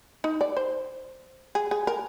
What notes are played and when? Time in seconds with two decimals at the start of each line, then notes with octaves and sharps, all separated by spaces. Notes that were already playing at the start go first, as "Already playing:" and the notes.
0.24 D#4
0.41 D5
0.57 C5
1.55 G#4
1.71 G#4
1.87 A#4